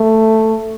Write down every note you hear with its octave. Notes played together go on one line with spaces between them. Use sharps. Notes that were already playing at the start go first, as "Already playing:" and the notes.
Already playing: A3